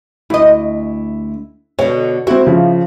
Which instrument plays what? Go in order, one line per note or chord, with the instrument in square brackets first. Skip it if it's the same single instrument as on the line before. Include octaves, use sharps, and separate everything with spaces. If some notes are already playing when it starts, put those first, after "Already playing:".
[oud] D2 D#5 [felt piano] E4
[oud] B2 D3 [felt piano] C#5
[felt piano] C4 F#4 [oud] E4
[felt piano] C#3 F3